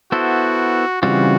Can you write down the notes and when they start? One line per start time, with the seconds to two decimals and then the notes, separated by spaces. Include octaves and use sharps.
0.12 B3 E4 F#4 A4 C5
1.02 C#3 E3 G3 C4 F4 F#4